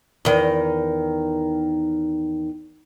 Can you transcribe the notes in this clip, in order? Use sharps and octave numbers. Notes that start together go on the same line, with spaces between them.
E2 D#3